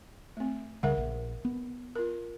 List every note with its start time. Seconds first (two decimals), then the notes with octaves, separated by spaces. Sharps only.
0.37 A3 C4
0.83 C2 C#3 G3 A#4 E5 F#5
0.98 A#1
1.45 B3
1.96 F4 A#4